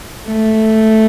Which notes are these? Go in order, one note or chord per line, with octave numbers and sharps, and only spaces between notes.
A3